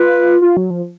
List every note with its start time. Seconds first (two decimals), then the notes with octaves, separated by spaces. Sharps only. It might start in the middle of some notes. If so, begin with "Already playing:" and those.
Already playing: F4 B4
0.42 F4
0.57 F#3
0.70 F3